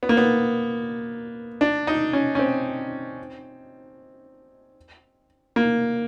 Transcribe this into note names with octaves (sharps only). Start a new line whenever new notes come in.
B3
A#3
B3
D4
D#4
C#4
C#4
C4
A#3